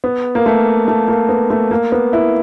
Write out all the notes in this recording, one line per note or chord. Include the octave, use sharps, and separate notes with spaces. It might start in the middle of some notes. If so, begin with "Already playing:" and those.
B3
A#3
A3
A3
A#3
B3
A3
A#3
B3
E4